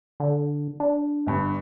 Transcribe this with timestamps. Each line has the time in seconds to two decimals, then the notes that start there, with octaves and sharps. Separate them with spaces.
0.20 D3
0.80 D4
1.27 G1 G2